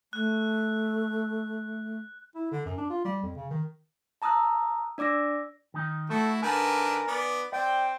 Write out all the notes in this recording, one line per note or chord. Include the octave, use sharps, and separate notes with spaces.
A3 F#6
E4
D3
F#2
D4
F4
G3
F2
C#3
D#3
A5 A#5 D#6 E6 F#6
D4 D5 D6 E6 A#6
D#3 D#4
A3 E4 F#4 A4
D3 D4 D#4 A#4 B4 G#5
B3 D5
C4 D5 G5